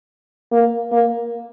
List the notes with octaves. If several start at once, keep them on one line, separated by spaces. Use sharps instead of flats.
A#3
A#3